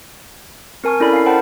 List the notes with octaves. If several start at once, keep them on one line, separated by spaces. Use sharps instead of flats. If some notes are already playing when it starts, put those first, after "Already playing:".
C4 A#4 G#5 A5 C#6
C#4 E4 A4 A#4 D5 B5
F5 C7
A#4 C5 F#5 G5 A5 B5